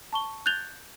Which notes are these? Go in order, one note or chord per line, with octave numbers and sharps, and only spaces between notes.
A5 C#6 G7
F#6 G6 A6 F7 G7